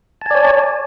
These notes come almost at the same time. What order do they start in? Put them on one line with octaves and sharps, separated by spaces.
A5 G#5 D5 C#5